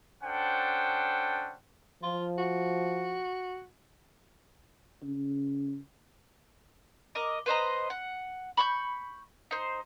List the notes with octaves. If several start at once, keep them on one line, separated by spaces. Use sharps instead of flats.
C#4 D4 A4 C5 F#5 G5
F3 F4
F#4
C#3
A#4 D#5 D6
B4 C5 D#5 A#5
F#5
B5 C#6 D#6 G6
D#4 C5